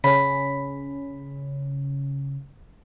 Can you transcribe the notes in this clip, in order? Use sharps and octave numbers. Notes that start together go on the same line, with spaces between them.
C#3 C#4 B5